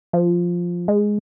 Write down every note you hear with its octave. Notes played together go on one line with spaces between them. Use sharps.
F3
G#3